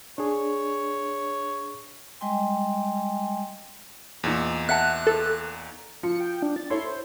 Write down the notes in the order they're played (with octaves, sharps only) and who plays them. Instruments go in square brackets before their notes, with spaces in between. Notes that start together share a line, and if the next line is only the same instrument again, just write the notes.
[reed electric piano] D4 G#4 [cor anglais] C#5
[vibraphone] G3 G#3 D#5 G5 G#5 C6
[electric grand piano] E2 A#2 D#4
[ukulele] E5 F#5 A5 [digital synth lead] F#6
[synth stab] A4
[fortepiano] F3 [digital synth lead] C#7
[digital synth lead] G5
D4
A6
[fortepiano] E4 A4 C#5 [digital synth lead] C6
[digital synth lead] C5